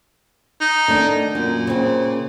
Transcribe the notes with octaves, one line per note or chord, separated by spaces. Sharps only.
D#4
D#3 A3 D4
F#2 A#2
C#3 C4